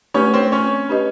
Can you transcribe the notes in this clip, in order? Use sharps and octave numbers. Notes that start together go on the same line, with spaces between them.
A3 C#4 D4 G4 B4 C#5
C4 C5
C#4 C#5
D4 G4 B4 D#5